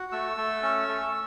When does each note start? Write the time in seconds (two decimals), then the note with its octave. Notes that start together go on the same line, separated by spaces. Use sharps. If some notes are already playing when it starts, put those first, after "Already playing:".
Already playing: F#4
0.12 A3 E6
0.37 A3
0.63 C#4
0.88 A3